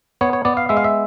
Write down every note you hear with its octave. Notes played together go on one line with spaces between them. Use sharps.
B3 C#5
C#5
B3 D5
F5
G#3 E5
F5
E5